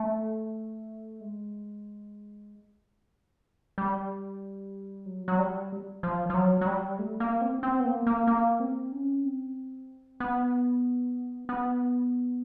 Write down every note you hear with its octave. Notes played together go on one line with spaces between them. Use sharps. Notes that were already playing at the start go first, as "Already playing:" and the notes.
Already playing: A3
G#3
G3
F#3
F#3
G3
F3
F3
F#3
F#3
G3
A3
A#3
C4
C4
B3
A#3
A#3
A#3
C4
C#4
C4
B3
B3